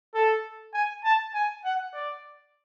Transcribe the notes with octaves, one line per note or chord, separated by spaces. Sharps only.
A4
G#5
A5
G#5
F#5
D5